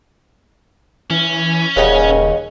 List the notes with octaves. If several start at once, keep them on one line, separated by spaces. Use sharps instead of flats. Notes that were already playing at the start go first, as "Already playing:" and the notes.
E3 C#4
D#1 D#2 C#3 B4 D#5 F#5